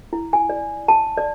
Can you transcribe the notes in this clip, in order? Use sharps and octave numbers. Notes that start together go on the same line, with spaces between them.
E4
G#5
D5
A5
D5